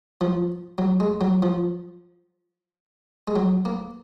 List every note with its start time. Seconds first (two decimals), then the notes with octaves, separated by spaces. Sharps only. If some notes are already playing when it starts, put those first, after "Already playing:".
0.21 F3
0.78 F#3
1.00 G#3
1.21 F#3
1.42 F3
3.28 G#3
3.36 F#3
3.65 A#3